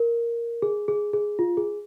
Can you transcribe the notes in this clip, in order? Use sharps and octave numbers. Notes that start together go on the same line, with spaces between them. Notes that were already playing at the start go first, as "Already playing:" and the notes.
Already playing: A#4
G#4
G#4
G#4
F4
G#4